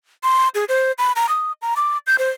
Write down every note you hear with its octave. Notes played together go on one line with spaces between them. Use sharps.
C6
G#4
C5
B5
A#5
D#6
A#5
D6
G6
C5